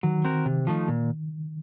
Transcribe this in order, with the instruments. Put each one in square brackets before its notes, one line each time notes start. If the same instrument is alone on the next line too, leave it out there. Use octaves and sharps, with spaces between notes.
[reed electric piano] D#3 [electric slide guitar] F#3
[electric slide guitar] C4 F#4 A#4
C3
F3 A3 D#4
A#2